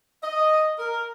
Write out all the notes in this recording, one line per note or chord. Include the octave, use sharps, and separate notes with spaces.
D#5
A#4